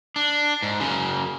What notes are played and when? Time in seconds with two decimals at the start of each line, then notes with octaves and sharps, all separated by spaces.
0.16 D4
0.62 G#2
0.80 F#2 C#3